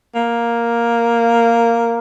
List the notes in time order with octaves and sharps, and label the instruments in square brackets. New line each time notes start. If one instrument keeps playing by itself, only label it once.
[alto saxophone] A#3